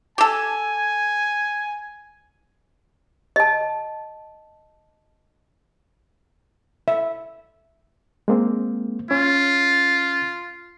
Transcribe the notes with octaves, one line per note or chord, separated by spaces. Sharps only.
G4 A4 G#5
D#5 A5
E5
G#3 A#3 C4
C#4 F4